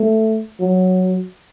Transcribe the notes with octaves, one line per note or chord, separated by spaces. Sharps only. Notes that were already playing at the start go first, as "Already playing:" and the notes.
Already playing: A3
F#3